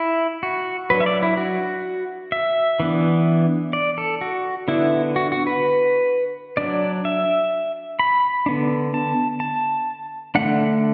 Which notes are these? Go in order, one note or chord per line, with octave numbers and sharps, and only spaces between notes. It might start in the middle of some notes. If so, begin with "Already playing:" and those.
Already playing: E4
F#4
F#3 D4 B4
E5
D5
E4
F#4
E5
E3 B3 D4
D5
A4
F#4
D3 B3 D4 E4
F#4
F#4
B4
F#3 D4 D5
E5
B5
D3 B3 D4
A5
A5
D3 A3 D4 F#5